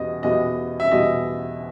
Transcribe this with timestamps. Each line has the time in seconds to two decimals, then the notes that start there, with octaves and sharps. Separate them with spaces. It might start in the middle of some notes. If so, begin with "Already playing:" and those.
Already playing: E2 B2 G3 B3 D#5
0.23 E2 B2 G3 B3 D#5
0.80 E5
0.91 E2 B2 G3 B3 D#5